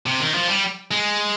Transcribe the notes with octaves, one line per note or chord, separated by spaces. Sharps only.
C3
D#3
F3
G3
G#3